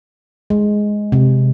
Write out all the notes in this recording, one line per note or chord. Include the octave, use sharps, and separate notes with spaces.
G#3
C3